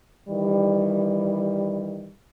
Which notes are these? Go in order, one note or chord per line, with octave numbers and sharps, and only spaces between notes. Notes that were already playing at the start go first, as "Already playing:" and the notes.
D#3 E3 G3